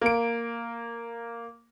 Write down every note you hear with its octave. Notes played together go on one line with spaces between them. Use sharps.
A#3 D7